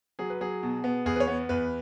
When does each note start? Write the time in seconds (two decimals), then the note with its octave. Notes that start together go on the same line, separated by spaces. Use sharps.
0.19 F#3 G#4
0.30 B4
0.41 F#3 G#4
0.63 B2
0.84 B3
1.06 E2 G#4
1.16 B4
1.20 C#5
1.27 B3
1.49 E2 B4